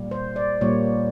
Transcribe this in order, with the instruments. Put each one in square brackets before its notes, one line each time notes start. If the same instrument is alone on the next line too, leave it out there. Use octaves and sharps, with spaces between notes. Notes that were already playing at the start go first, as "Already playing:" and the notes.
Already playing: [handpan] A#2 G3 A#3
C5
D5
A#2 G3 A#3 C#5